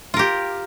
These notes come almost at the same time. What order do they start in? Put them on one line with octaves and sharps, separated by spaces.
F4 A#4 G4